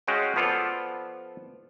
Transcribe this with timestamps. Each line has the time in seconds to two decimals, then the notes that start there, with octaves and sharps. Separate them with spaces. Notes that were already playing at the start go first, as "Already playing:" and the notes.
0.07 G#3 C#4 F#4 F5 G5
0.36 F3 B3 F4 A4 D5